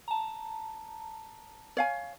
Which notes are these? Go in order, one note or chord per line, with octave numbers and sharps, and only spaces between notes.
A5 A#5
C#5 F5 G#5